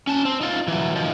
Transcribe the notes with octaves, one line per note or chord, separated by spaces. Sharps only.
C#4 A5
C4
D#4 F4
E3 F#3
D#3 F3